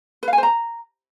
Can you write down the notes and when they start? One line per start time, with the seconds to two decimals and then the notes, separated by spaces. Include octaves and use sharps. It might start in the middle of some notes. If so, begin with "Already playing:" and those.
0.23 B4
0.28 F5
0.33 G#5
0.38 C5
0.43 A#5